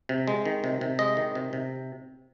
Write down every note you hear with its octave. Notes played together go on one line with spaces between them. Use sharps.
C3
G#3
D#3
C3
C3
G#3 D#5
D#3
C3
C3